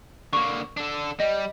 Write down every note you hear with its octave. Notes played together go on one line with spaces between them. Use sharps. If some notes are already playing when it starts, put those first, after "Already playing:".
D3 A#3 C#6
D4 A4
G3 D#5